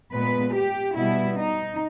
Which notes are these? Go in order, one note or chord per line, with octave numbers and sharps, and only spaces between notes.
A#2 G#3 B3 B4
G4
B2 G3 B3 E4
D#4